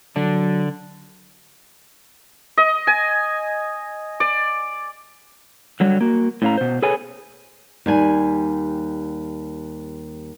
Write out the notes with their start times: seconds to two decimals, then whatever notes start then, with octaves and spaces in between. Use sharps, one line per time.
0.16 D3 F#3 D4
2.57 D#5
2.87 G#5
4.20 D5
5.80 D3 F#3 G3
6.01 A#3 F#4
6.42 A2 C#4 F5 A#5
6.58 B2 C5
6.82 G#4 A4 B4 C#5 G#5
7.86 D#2 G3 G#5